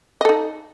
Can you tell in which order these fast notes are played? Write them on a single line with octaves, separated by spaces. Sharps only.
D#5 A4 D#4